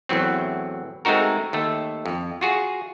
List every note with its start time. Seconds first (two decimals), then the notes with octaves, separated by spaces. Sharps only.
0.09 E2 A2 E3 F#3 C4
1.05 G#3 A3 C4 D#4 F#4 A#4
1.53 D#2 A3 A4
2.06 F2
2.41 F4 F#4 G#4